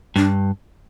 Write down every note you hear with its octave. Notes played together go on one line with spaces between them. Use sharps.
G2 D4